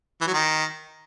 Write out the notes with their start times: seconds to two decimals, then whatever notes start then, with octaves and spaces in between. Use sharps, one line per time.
0.21 E3
0.27 F#3
0.33 D#3